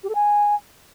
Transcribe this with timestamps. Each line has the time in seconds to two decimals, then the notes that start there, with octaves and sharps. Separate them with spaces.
0.03 G4
0.09 A4
0.15 G#5